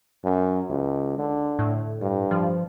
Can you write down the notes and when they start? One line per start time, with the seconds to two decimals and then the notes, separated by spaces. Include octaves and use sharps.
0.24 F#2
0.70 C#2
1.18 D3
1.59 A2
2.02 G2
2.31 F3